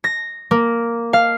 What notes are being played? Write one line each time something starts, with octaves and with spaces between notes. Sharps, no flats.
A#6
A#3
F5